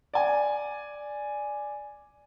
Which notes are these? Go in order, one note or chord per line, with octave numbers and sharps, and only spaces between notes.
D5 G#5